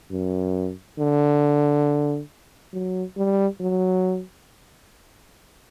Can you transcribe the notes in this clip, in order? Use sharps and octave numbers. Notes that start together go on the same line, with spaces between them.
F#2
D3
F#3
G3
F#3